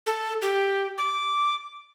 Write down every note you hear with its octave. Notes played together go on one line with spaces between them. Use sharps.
A4
G4
D6